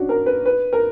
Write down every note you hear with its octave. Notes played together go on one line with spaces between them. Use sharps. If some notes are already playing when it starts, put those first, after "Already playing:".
Already playing: C#4 D4 F#4
A#4
B4
B4
A#4